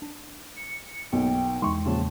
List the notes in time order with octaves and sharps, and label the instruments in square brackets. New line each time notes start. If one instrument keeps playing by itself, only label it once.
[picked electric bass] D4
[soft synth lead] C#7
[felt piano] B1 A#3 D#4 [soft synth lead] G5
[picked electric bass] E2 E3 G#3 [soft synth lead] D#4 [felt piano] C6 C#6
[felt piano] A#2 C#3 F3 [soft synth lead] A5